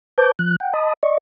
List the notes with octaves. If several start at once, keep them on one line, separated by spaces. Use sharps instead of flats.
B4 C5 A5 D6 G6
F3 F#6
F#5 G5
D#5 A5 B5 D#6
D5 D#5 C#6